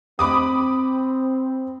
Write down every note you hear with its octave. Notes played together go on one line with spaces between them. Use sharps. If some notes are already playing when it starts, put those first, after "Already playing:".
C4 B5 D6 D#6